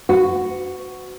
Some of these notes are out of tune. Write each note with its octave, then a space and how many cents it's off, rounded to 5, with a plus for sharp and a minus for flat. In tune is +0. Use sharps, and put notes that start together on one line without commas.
F#4 +0 B4 +45